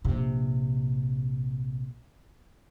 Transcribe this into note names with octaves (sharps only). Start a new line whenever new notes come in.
A#1 C3